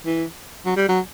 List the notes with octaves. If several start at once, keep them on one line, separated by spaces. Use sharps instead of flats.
E3
F#3
G3
F#3